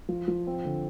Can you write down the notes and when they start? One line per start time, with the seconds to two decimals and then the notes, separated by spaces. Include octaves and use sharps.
0.09 F3
0.28 F3
0.47 C4
0.65 D3